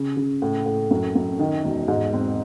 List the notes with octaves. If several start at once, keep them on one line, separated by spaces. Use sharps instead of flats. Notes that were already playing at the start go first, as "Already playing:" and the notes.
Already playing: C#3
C#3
A2
A2
F#2
F#2
D#3
E1
G#2
C4